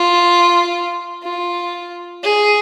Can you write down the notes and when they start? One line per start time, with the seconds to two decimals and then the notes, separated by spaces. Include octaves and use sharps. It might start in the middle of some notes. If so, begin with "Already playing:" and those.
Already playing: F4
1.23 F4
2.23 G#4